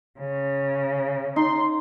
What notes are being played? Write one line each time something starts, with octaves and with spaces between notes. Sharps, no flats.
C#3
D#4 C6